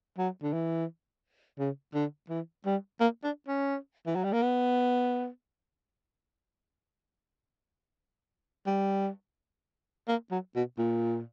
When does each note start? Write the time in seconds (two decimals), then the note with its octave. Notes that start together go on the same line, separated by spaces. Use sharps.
0.18 F#3
0.43 D3
0.53 E3
1.59 C#3
1.94 D3
2.29 E3
2.65 G3
3.00 A#3
3.24 D4
3.48 C#4
4.07 E3
4.15 F#3
4.24 G3
4.33 A#3
4.42 B3
8.66 G3
10.08 A#3
10.31 F#3
10.56 B2
10.78 A#2